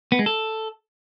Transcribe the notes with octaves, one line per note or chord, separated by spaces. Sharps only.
B3
G#3
A4